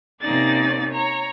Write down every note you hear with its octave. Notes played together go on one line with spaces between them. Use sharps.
C3 A#3 C#4 D#4 D5 A6
C#5 A#5